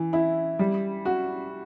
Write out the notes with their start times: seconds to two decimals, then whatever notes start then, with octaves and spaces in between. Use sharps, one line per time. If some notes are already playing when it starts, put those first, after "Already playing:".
Already playing: E3
0.13 E4
0.59 G3
1.05 F#4